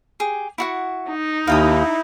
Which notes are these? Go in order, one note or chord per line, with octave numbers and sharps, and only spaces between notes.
G4 G#4
E4 F#4 F#5
D#4
D#2 E4 F5 G5 D#6